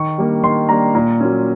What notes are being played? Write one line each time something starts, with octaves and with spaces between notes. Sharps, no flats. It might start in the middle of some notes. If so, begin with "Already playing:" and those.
Already playing: D#3 C#6
G3 A#3 D4
D#3 C6
G3 A#3 D4 A#5
A#2 A#5
F#3 A#3 C#4